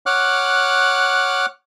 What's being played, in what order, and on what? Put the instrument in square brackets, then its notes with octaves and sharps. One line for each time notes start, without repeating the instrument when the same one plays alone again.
[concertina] C#5 F#5 D6 F6 F#6